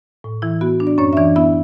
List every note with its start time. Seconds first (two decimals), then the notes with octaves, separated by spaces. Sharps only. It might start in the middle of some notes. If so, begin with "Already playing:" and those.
0.24 A2
0.42 E3 E4
0.61 B3 F#4
0.80 D4
0.87 D5
0.98 F#2 C#4 C#5
1.13 E5
1.17 E3 D4 D5
1.36 B3 E4 E5